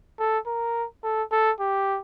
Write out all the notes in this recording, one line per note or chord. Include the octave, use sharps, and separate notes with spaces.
A4
A#4
A4
A4
G4